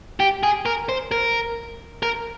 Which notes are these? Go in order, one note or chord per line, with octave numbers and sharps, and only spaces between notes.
G4
G#4
A#4
C5
A#4
A#4